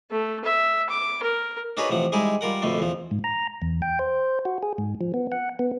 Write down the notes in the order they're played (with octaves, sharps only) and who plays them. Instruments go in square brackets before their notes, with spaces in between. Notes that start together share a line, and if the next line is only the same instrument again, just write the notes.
[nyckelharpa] A3
E5
D6
A#4
[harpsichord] D4 D#4 F#4 G#4 B4 C#5
A1 C3 F3 F#5
G3 G#3 D#4 E4 G#4
G3 F4 A#4 F#5
F2 B2 D3 A3
E2 F3
[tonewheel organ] G#2
A#5
E2
G5
C5
F#4
G#4
G#2
F3
B3
F#5
B3